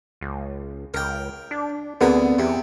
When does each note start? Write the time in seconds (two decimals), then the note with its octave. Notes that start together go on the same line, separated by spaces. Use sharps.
0.21 C#2
0.94 C#2 A#4 G5
1.51 D4
2.01 D2 D3 B3 C4 G#4 A#4 F#5
2.39 E2 C3